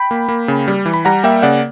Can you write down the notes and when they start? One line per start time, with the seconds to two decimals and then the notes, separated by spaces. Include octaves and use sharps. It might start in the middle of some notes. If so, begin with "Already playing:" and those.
Already playing: G5 B5
0.11 A#3
0.28 A#3
0.48 C#3
0.68 G3
0.86 E3
0.94 B5
1.05 G3 F#5 A#5
1.24 A#3 E5 G5
1.42 C#3 D5 F#5